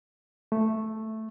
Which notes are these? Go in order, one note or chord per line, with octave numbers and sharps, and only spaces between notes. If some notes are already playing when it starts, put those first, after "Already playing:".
A3